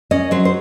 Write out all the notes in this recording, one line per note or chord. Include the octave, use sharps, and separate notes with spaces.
C#4 D#5
F#3 C5
C5